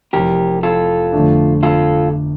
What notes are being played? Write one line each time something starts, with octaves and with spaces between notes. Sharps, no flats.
F1 F2 E3 G4 A#4
F4 A4
G1 F2 D3 A3 D4
F4 A4